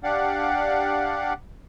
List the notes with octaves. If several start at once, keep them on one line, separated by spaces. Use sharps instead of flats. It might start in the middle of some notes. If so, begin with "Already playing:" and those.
D4 G4 D5 F5 F#5